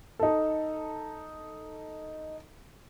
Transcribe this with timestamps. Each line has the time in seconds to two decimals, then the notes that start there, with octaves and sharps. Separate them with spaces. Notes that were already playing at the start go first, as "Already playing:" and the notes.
0.19 D#4 A4